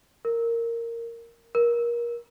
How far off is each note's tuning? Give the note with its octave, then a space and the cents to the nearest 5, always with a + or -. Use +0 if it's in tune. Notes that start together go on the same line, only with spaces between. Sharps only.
A#4 -10
A#4 +25